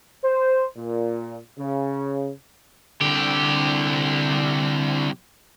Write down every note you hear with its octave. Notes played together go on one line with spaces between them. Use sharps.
C5
A#2
C#3
C2 D3 G4